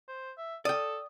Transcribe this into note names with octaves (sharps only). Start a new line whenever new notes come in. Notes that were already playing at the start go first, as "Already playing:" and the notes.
C5
E5
A4 D5 G5 D#6